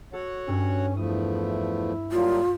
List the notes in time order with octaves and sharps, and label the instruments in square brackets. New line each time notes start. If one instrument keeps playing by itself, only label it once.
[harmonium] F#4 C#5 F#5 [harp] A4
[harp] G2 [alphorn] C#4
[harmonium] E2 F3 A3 [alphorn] E4 [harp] D#6
[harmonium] F#3 G3 A#3 [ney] F4